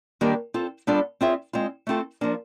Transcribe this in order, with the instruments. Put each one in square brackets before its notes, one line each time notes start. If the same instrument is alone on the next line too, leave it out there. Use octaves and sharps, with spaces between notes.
[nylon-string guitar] D#3 G3 A#3 D4 G4
C4 F4 A4
G3 B3 D4 F4 A4
C4 F4 G#4 C#5 E5
G#3 C4 F4
A3 C4 F4 A4
F3 A#3 D4